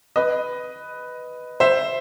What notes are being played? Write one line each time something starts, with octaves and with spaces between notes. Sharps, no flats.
B4 D#5
C5 E5